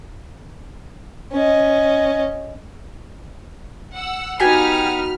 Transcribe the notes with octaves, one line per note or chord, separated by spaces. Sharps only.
C#4 D#5
F#5 E6
B3 D#4 F#4 G4 G5 G#5 F6 B6